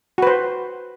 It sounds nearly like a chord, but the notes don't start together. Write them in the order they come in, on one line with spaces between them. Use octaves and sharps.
F#4 B4 C5